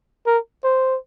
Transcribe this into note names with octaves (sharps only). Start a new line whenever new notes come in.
A#4
C5